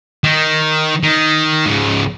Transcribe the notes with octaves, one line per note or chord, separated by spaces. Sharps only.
D#3
D#3
G#2 C#3